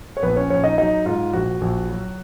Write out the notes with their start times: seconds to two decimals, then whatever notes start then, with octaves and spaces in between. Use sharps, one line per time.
0.17 C#5
0.22 A#1 B3 B4
0.36 C#4 C#5
0.50 A#1 C#4 C#5
0.64 D#4 D#5
0.78 F#3 D#4 D#5
1.06 G#2 F4
1.33 A#1 F#4
1.61 A#1
1.89 F#3